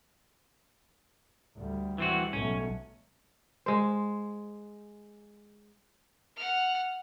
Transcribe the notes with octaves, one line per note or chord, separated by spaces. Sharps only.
D2 G3
E3 C4 F#4
B1 A3 C#4
G#3 C5
F#5 F6